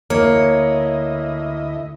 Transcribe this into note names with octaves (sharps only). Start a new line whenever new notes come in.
D2 A#3 E4 C#5 D#5